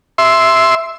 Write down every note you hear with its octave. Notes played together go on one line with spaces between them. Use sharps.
E5 C6